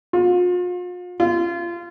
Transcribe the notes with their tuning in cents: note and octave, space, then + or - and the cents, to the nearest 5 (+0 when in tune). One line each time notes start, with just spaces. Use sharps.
F4 +40
F4 -25